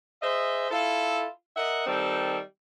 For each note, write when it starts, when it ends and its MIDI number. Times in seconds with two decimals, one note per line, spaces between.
0.22 0.70 68
0.22 0.70 72
0.22 0.70 75
0.22 0.70 76
0.71 1.27 64
0.71 1.27 65
0.71 1.27 69
1.56 1.83 70
1.56 1.83 75
1.56 1.83 76
1.56 1.83 78
1.87 2.38 51
1.87 2.38 55
1.87 2.38 60
1.87 2.38 69